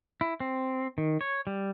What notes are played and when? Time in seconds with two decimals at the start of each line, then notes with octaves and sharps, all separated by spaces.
0.21 E4
0.40 C4
0.98 D#3
1.21 C#5
1.47 G3